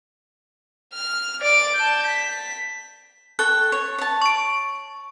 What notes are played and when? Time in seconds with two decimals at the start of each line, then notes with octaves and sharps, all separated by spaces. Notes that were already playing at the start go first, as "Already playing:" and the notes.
0.94 F6
1.41 D5 D7
1.75 A5 G6
2.07 B6
3.39 A4 G5 C#6 F#6
3.72 C#5
3.98 C#5 A5
4.22 C#6 D7